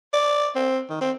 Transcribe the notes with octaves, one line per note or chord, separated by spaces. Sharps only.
D5
C4
D#3
C4